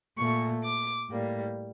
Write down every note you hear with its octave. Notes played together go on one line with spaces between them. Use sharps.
A#2 A3 C#6
D6
A2 G3 A#3